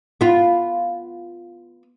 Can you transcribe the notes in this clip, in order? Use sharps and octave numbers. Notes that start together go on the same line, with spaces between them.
B3 F4